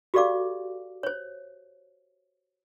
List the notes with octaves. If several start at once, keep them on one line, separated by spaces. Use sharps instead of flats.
F#4 G4 A4 D5 F5 D6
C5 C#5